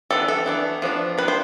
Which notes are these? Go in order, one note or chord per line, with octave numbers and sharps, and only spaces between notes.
E3 B3 D4 A4
A4
E3 B3 D4
F3 B3 D4
F3 B3 D4 B4
C5